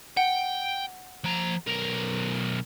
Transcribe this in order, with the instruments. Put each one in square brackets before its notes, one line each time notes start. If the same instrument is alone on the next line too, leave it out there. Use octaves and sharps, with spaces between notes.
[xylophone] F#5 [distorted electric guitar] G5
[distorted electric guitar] F3 A#5
B1 A#4